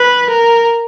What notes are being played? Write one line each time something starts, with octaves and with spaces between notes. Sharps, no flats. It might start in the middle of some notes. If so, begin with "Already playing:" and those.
Already playing: B4
A#4